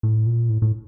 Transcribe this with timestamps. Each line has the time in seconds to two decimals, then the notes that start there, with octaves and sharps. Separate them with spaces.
0.03 A2
0.26 A#2
0.49 A2
0.62 A2